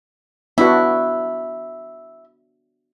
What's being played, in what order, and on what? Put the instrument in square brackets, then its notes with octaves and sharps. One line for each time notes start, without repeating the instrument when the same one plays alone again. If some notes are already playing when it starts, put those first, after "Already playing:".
[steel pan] B3 D4 F#4 [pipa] E4